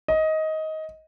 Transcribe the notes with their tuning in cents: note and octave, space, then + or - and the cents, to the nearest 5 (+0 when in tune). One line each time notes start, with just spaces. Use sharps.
D#5 +15